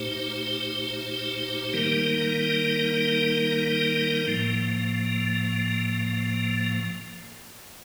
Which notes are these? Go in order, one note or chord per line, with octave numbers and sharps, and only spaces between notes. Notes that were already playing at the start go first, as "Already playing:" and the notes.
Already playing: A#2 A3 D#4 G4 C5
D#3 G3 A#3 D#4 A#4
A2 F3 A#3